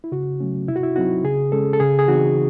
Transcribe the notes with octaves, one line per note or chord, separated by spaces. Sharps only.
E4
C#3 F#4
F#3 A3 C#4
C3 E4
F#4
E4
F#3 C4 D#4 F#4
C#3 G#4
G#3 C#4 A4
A4
C#3 G#4
G#4
E3 C4 D#4 F#4